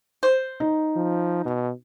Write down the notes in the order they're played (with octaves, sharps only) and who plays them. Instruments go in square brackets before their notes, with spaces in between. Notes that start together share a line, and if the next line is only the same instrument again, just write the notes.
[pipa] C5
[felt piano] D#4
[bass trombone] F3
B2